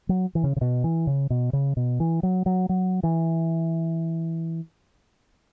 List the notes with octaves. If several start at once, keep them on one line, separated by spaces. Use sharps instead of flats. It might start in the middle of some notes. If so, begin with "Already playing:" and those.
F#3
E3
C#3
C#3
B2
E3
C#3
B2
C#3
B2
E3
F#3
F#3
F#3
E3